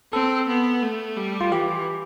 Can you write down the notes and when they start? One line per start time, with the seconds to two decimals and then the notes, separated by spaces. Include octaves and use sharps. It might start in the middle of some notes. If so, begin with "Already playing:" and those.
0.12 C4 A4
0.48 B3
0.82 A3
1.17 G3
1.41 F4
1.51 E3 G4